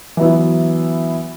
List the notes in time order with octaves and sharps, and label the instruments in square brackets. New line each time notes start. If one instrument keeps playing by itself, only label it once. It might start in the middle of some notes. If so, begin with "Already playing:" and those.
[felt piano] E3 F#3 B3 E4